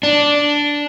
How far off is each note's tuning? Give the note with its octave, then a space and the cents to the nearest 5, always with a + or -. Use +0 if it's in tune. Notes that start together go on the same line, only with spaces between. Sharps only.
D4 -5